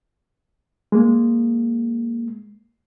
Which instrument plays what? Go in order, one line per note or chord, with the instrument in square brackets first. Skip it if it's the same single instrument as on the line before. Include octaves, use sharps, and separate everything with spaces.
[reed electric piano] G#3 A#3